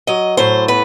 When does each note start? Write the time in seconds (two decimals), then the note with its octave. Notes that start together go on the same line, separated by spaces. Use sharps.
0.07 F#3 D#5
0.37 A2 C5
0.68 B3 B4